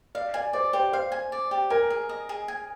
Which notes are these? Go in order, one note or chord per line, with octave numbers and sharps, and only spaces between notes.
D5 F5
D5 G#5
C5 D5
G4 C5
C5 F5
G#5
D5
G4
A#4 G#5
G#4
D#5
G#4
G#5